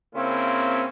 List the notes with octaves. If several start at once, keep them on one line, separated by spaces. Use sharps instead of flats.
C#3 A#3 C4 C#4 E4